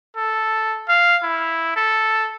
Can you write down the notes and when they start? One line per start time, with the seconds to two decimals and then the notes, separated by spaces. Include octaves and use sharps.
0.17 A4
0.89 F5
1.24 E4
1.77 A4